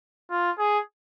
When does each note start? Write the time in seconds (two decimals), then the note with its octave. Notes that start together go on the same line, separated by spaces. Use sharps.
0.31 F4
0.58 G#4